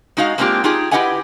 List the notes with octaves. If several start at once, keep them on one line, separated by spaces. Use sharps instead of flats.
G#3 D#4 F#4 D#5 F5
G#3 A#3 C4 D4 F4 G4
D#4 F4 G4 G#4
E4 G4 B4 D#5 F#5 G#5